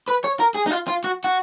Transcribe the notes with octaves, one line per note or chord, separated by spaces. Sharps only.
B4
C#5
A#4
G#4
D#4
F4
F4
F#4
F#4